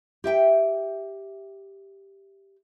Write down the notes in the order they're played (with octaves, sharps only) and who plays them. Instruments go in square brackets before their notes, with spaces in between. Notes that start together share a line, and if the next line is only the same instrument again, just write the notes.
[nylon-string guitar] G4 E5 G5